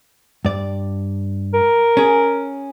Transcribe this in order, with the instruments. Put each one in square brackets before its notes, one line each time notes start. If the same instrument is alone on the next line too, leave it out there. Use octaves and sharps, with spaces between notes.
[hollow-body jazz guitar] G2 D5
[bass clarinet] A#4
[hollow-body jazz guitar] C#4 G#4